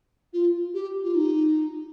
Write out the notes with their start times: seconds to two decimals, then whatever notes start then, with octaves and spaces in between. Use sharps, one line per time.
0.33 F4
0.74 G4
1.03 F4
1.15 D#4